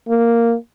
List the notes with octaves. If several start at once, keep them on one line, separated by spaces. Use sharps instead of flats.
A#3